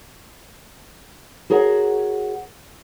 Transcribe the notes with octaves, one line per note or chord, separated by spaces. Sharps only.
F#4 G#4 A#4 C#5 F#5